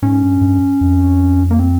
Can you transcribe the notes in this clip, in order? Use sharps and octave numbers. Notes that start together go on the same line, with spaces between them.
G#2 C#4
G2
G2
F2
A#3
C4